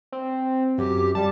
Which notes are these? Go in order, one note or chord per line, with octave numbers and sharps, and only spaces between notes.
C4
F#2 G4
G3 A5